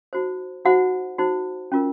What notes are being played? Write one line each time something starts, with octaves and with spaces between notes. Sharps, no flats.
D#4 F#4 C5
D#4 F#4 C5 F#5
D#4 F#4 C5
C#4 F4 A#4